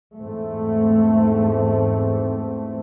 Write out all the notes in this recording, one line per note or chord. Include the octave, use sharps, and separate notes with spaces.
E2 G#2 A3 C4